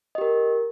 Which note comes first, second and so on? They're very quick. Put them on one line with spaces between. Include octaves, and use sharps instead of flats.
D#5 G4 A#4